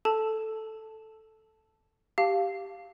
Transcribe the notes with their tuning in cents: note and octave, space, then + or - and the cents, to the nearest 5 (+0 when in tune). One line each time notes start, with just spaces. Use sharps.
A4 +0 A5 +0
G4 +0 F5 +0 A5 +0